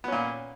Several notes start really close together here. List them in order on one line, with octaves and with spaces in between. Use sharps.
B3 C#4 A#2